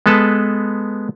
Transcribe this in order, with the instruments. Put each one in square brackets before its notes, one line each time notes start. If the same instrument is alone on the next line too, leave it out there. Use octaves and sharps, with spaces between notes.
[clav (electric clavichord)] G#3 B3 A4 B4 A5